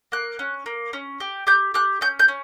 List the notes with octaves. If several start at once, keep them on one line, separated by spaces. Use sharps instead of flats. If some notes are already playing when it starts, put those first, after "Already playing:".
A#3 F#6
C#4
A#3
C#4
G4
G4 G6
G4 F#6
C#4 G6
G6
C#4